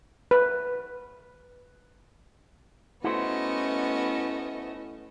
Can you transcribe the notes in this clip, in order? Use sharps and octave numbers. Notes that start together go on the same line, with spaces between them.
B4
A3 B3 C#4 E4 F#4 C5 D#5